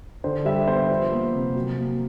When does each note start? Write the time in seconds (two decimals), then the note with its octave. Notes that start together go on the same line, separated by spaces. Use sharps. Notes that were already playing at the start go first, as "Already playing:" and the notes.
0.24 D3 C5
0.45 G3 E5
0.68 B3 C5
0.90 F3
1.12 A#3
1.34 C3
1.55 F#3
1.77 A#3